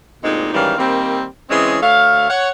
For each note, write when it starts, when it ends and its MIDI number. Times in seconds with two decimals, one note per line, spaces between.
0.23 0.52 38
0.23 0.52 46
0.23 0.52 56
0.23 0.52 60
0.23 0.52 63
0.54 0.76 44
0.54 0.76 51
0.54 0.76 52
0.54 0.76 55
0.54 0.76 61
0.54 0.76 77
0.78 1.25 51
0.78 1.25 55
0.78 1.25 58
0.78 1.25 60
1.50 1.77 49
1.50 1.77 52
1.50 1.77 56
1.50 1.77 60
1.50 1.77 61
1.50 1.77 68
1.83 2.27 38
1.83 2.27 57
1.83 2.27 73
1.83 2.27 77
2.30 2.50 73
2.30 2.50 78